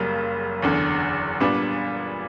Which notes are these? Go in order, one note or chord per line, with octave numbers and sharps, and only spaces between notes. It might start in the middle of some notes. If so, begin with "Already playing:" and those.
Already playing: F#1 F#2 C#3 G3 A#3
F#1 E2 D3
A#2 G3 B3 D4